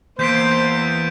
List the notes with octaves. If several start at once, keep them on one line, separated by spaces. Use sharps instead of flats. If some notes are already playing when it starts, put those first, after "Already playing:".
E2 A#3 C5 G6 B6 D7